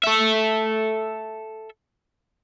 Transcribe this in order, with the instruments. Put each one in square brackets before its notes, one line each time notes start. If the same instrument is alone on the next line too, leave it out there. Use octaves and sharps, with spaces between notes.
[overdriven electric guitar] A4 E5